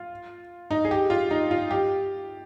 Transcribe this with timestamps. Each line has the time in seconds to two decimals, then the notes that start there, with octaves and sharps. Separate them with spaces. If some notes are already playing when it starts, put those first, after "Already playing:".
Already playing: F4
0.71 D#4
0.85 G#4
0.91 G4
1.10 F4
1.31 D#4
1.51 F4
1.71 G4